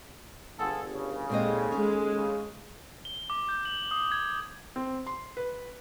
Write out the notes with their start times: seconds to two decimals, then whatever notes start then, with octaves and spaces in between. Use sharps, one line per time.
0.60 G1 F4 G#4 A4 F#5
0.94 C#3
1.30 D#2 A#2 G#3 C4 A4 D#5
1.72 G#3 C#4
2.15 C#3
3.05 G7
3.30 D6
3.49 G6
3.65 F#7
3.91 D#6
4.12 G#6
4.76 C4
5.07 C6
5.37 B4